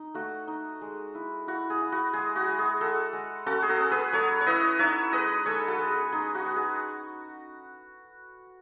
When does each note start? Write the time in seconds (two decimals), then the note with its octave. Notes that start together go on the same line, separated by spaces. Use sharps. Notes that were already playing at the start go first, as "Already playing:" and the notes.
Already playing: D#4
0.14 A3 F#4
0.48 D#4
0.82 G#3
1.15 E4
1.47 E4 F#4
1.70 G#4
1.81 E4
1.92 F#4
2.13 G#3 G#4
2.36 F#4
2.47 G#3
2.59 G#4
2.81 G#3 F#4 A4
3.13 G#3
3.46 C#4 F#4 A4
3.62 G#4
3.69 F#4 A4
3.80 C#4
3.91 G#4 B4
4.13 F#3 A4 C#5
4.40 C#5
4.46 E4 B4 D#5
4.79 D#4 C#5 E5
5.12 G#3 B4 D#5
5.45 G#3 A4 C#5
5.68 F#4 A4
5.79 G#3
5.90 G#4
6.12 D#4 G#4
6.35 F#4
6.46 G#3
6.56 G#4